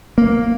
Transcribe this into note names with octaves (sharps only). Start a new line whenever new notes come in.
A#3